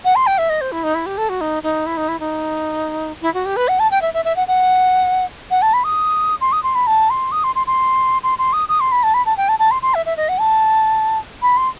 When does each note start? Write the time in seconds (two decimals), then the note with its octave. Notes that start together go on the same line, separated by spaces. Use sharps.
0.04 F#5
0.16 C6
0.27 G5
0.38 E5
0.50 D#5
0.61 C5
0.72 E4
0.83 D#4
0.95 E4
1.06 G4
1.18 A4
1.29 F#4
1.41 D#4
1.63 D#4
1.86 E4
1.97 D#4
2.08 E4
2.20 D#4
3.22 E4
3.34 F#4
3.45 G4
3.56 B4
3.68 F#5
3.80 A5
3.91 G5
4.02 E5
4.14 E5
4.25 E5
4.36 F#5
4.48 F#5
5.51 F#5
5.62 A5
5.74 B5
5.84 D#6
6.41 C6
6.52 D#6
6.63 C6
6.75 B5
6.87 A5
7.10 C6
7.32 D#6
7.44 C6
7.55 C6
7.67 C6
8.23 C6
8.39 C6
8.53 D#6
8.69 D#6
8.80 C6
8.92 B5
9.03 A5
9.14 B5
9.26 A5
9.37 G5
9.49 A5
9.59 A5
9.71 C6
9.82 C6
9.95 E5
10.06 E5
10.17 D#5
10.29 F#5
10.40 A5
11.42 B5
11.57 C6